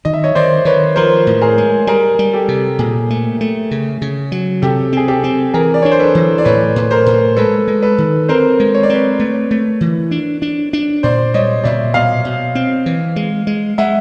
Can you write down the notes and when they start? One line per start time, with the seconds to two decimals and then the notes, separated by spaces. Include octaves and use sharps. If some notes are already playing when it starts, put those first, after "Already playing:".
0.05 D#3 D#5
0.14 E5
0.24 C#5 D#5
0.35 D#3 C5 D5
0.65 D#3 B4 C#5
0.96 F3 A#4 C5
1.27 A2
1.41 G#4 A#4
1.58 G#3
1.87 G3 G#4 A#4
2.19 G3
2.33 G4 A4
2.48 C3
2.79 A#2 G#4
3.10 A3
3.41 A3
3.71 C#3
4.02 C#3
4.32 F#3
4.62 C3 G4 A4
4.93 C4 G#4
5.08 G4 A4
5.24 C4
5.54 E3 G#4 A#4
5.74 D5
5.82 D4 C#5
5.91 C5
6.00 A4 B4
6.15 E3
6.38 D5
6.45 A2 B4 C#5
6.76 A2
6.91 A#4 C5
7.06 A2
7.37 G#3 A4 B4
7.67 G#3
7.82 A4 B4
7.98 D#3
8.29 C4 A#4 C5
8.60 G#3
8.74 C#5
8.83 D5
8.89 C4 B4 C#5
9.20 A3
9.51 A3
9.81 E3
10.11 D4
10.42 D4
10.73 D4
11.03 A#2 C5 D5
11.34 G3 C#5 D#5
11.64 A#2 D5 E5
11.94 B2 D#5 F5
12.25 B2
12.55 C4
12.86 E3
13.16 G#3
13.47 G#3
13.78 G#3 E5 F#5